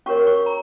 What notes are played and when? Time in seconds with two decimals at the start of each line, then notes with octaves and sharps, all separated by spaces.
0.06 C#4 F#4 A#4 C#5 C#6
0.27 C#6
0.46 A#5